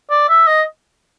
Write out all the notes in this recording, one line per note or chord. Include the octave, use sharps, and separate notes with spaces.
D5
E5
D#5